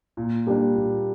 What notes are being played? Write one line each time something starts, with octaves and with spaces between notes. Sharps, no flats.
A#2
G3 A#3 D4
A#2